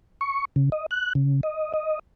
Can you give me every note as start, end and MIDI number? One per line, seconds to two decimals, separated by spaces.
0.21 0.45 85
0.56 0.70 49
0.72 0.86 75
0.91 1.13 90
1.15 1.41 49
1.43 1.73 75
1.74 1.99 75